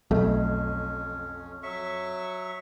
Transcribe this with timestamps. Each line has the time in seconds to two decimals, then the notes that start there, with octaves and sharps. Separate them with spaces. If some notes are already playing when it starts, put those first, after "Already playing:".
0.11 B1 F2 A3 C#4
1.63 F#3 E5 C#6